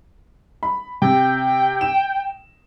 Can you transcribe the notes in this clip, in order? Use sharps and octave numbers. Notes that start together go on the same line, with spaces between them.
B5
C3 G5
E7